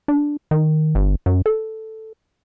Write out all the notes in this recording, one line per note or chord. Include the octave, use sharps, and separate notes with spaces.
D4
D#3
G1
F#2
A4